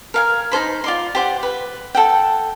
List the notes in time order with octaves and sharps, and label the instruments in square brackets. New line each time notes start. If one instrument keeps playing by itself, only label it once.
[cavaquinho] A#4 F5 G#5
D#4 A4 C5 B5
F4 D5 C6
G4 C5 F#5
B4
A4 F#5 G5